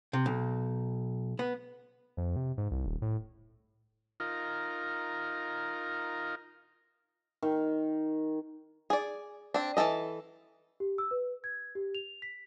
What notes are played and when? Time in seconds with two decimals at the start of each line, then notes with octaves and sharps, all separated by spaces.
0.13 C3
0.26 B1
1.39 B3
2.17 F2
2.36 C3
2.58 G#2
2.71 C2
2.86 D#1
3.02 A2
4.20 D#4 F4 A#4
7.42 D#3
8.90 G#4 D5
9.54 C4 D4
9.77 E3 F3 A4 D#5
10.80 G4
10.98 E6
11.11 B4
11.44 G#6
11.75 G4
11.95 F7
12.22 B6